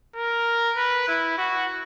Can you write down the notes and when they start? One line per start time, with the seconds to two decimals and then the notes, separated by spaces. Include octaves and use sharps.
0.16 A#4
0.77 B4
1.08 E4
1.38 F#4